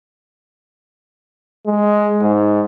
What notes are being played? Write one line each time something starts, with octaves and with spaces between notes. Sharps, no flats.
G#3
G#2